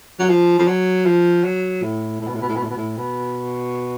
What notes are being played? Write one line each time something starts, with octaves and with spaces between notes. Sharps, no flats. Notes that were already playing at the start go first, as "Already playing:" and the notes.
F#3
F3
F3
F#3
F3
F#3
A2
A2
B2
A2
B2
A2
B2
A2
B2
A2
B2